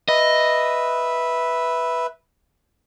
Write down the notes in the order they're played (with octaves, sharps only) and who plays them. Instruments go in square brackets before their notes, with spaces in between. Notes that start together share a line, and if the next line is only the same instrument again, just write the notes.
[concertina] B4 E5 [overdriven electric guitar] D#5